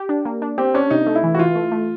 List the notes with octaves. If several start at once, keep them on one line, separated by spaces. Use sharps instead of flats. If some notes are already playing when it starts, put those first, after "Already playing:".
Already playing: G4
D4
A#3
D4
C4 G4
C#4 D4
C3 D#4
A3
E4
E3
F#4
E3 F4
A3
A3